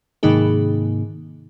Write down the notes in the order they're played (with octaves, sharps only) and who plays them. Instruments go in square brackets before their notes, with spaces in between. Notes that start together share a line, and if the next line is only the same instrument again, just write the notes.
[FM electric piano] G#2 C3 D#3 A#3 D#4 G#4